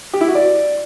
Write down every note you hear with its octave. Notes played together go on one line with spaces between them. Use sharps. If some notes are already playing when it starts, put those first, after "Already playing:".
G4
E4
F#4
D5